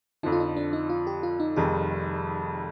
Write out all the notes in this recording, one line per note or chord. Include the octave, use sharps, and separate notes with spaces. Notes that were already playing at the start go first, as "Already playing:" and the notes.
F2 D3 F3 D#4
F4
D#4
D4
D#4
F4
G4
F4
D#4
F1 F2 D#3 G3 G#4